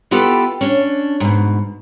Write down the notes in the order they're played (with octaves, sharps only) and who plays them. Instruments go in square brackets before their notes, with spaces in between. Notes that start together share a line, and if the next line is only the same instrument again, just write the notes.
[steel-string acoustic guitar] B3 E4 F4 G4 A4 B4
C#4 D4
G#2 B2